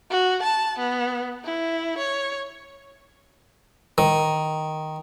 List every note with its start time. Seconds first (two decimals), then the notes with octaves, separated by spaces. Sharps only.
0.10 F#4
0.43 A5
0.79 B3
1.44 E4
1.98 C#5
3.98 D#3